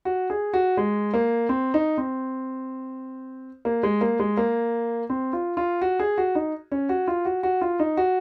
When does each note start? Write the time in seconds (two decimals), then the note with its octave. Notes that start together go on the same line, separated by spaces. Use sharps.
0.05 F#4
0.30 G#4
0.53 F#4
0.77 G#3
1.14 A#3
1.49 C4
1.74 D#4
1.98 C4
3.65 A#3
3.83 G#3
4.01 A#3
4.19 G#3
4.37 A#3
5.10 C4
5.33 F4
5.57 F4
5.81 F#4
5.99 G#4
6.18 F#4
6.35 D#4
6.72 C#4
6.89 F#4
7.07 F4
7.25 F#4
7.43 F#4
7.61 F4
7.80 D#4
7.97 F#4